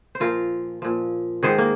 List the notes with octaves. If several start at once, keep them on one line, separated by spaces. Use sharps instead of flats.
C5
A#2 F3 F4 A#4
A#2 F3
G#2 D#3 G#4 C5
A#3